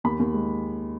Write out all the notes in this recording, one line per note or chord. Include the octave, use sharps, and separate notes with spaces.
D#2 B5
D#2
G#3